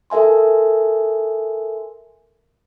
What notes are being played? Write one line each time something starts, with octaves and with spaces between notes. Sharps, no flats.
A4 A#4 E5 G#5 C6